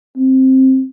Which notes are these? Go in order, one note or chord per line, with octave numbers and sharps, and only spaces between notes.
C4